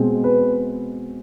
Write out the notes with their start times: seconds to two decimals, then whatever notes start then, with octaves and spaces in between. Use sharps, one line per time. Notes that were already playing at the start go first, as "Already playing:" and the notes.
Already playing: B2 G#3 C4
0.24 B4